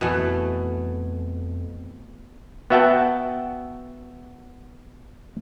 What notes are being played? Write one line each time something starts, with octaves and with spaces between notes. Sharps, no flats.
F2 B2 E3 A3
B3 F#4 E5 F#5 G5 A5